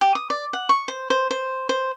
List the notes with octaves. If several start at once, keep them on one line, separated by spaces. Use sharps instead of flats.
G4
D#6
D5
F#5
C#6
C5
C5
C5
C5